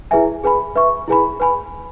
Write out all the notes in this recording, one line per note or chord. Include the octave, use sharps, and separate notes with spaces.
E4 G#4 B4 E5 G#5
G#4 B4 G#5 B5
B4 E5 C#6
E4 G#4 B4 G#5 B5
B4 G#5 B5